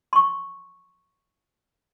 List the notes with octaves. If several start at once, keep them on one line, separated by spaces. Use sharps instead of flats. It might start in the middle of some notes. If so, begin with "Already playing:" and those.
C6 C#6